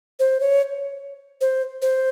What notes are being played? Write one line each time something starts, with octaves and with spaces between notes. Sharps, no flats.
C5
C#5
C5
C5